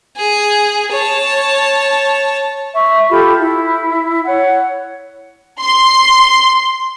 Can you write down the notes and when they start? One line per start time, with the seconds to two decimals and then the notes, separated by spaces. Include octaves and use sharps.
0.17 G#4
0.92 C#5 A5
2.75 E5 C#6
3.11 F4 G4 A4 B5
3.38 E4
4.26 C#5 F#5
5.62 C6